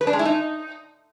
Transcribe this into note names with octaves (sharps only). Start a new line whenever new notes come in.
B4
D4
G#3
E4
D#4